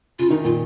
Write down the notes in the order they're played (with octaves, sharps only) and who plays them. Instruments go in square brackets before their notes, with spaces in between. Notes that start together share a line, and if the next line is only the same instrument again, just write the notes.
[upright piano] C#3 [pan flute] F4
[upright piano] D#3 [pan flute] D#4
[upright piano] A#2 [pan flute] F4